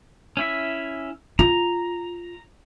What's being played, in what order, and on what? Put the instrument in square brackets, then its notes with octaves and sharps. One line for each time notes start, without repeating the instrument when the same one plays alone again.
[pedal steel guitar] C#4 E4 E5
[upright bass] F4 [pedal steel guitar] A#5